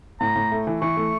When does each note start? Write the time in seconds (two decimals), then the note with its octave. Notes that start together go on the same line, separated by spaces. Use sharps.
0.21 A2 A#5
0.36 A2
0.52 A3
0.67 E3
0.82 E3 C#6
0.97 A3